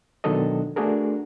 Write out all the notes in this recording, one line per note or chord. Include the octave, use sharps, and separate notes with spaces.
B2 D#3 F#3 D4 A4 D#5
A3 D4 F#4 G#4 A#4